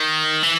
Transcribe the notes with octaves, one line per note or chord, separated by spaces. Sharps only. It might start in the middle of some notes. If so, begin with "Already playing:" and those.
Already playing: D#3
E3